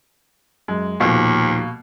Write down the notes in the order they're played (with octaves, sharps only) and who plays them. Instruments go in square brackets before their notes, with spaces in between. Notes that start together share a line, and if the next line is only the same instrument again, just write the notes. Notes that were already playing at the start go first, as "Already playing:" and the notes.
[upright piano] F#2 [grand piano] G#3
[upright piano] D#1 F3 [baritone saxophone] D#2 [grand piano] B2 A#3